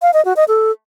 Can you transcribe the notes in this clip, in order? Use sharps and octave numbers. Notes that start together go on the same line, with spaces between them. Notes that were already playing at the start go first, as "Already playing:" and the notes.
F5
D#5
F#4
D#5
A4